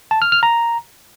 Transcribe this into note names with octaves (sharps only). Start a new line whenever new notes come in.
A5
F6
F6
A#5